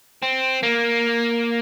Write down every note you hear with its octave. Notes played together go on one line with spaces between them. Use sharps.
C4
A#3